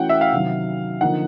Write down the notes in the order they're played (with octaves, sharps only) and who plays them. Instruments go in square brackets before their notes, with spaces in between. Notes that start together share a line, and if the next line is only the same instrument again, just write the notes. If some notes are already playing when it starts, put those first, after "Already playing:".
Already playing: [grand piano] E3 A3 C#4 F#4 [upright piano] F#5 G5
[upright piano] E5
F5
[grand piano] C3 D#3 F#3
[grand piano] D3 F3 A#3 D#4 [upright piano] F#5